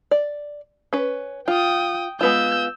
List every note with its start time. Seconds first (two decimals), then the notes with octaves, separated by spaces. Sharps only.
0.11 D5
0.93 C#4 B4
1.48 F4 G5 D#6
2.21 G#3 B3 F4 E6 G6